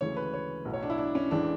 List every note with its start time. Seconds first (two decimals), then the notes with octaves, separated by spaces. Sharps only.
0.01 D2 C#3 E3 G#3 C#5
0.17 B4
0.34 C#5
0.65 B1 A2 F#3
0.73 C#5
0.83 D4
0.90 E4
0.98 D4
1.15 C#4
1.31 A1 A2 E3 G#3 D4